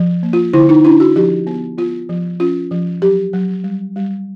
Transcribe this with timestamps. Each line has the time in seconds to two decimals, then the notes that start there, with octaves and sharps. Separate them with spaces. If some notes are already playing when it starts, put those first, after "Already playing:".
Already playing: F3
0.23 A#3
0.33 F4
0.53 D3 E4
0.69 D#4
0.85 D4 E4
1.00 F#4
1.16 F3 G4
1.47 B3
1.78 B3 F4
2.09 F3
2.40 C#4 F4
2.71 F3
3.02 F#3 G4
3.33 F#3
3.64 G3
3.96 G3